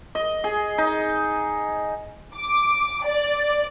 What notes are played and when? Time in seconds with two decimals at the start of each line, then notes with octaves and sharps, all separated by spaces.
0.15 D#5
0.44 G#4
0.78 D#4
2.35 D6
3.04 D5